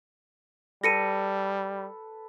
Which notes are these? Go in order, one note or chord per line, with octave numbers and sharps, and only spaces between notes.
G3 A4 B4 A#6 C#7 D#7